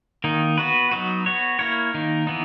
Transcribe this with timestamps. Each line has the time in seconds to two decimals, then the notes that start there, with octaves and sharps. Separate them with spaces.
0.24 D#3 A#3 D#4
0.58 B3 F#4 B4
0.91 F#3 B3 D#4 F#4
1.26 B3 F#4 C#5
1.59 A#3 E4 A#4 C#5
1.94 D#3 A#3 D#4
2.27 E3 B3 D#4